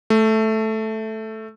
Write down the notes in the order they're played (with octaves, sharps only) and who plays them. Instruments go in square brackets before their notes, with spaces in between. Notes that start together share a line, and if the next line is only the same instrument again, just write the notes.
[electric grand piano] A3